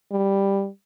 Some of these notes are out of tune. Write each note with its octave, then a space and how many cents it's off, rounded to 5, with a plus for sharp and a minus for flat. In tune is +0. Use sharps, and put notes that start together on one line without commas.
G3 +5